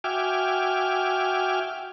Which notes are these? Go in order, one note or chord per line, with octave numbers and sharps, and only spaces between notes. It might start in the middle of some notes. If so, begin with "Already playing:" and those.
F#4 E5 G5 G#5 D6 F6